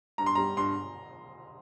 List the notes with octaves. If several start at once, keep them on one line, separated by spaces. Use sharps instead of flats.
G2 A#5
C6
G3 A#5
G2 C6